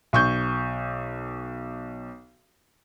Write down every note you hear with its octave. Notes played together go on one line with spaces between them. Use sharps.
B1 C#6 G6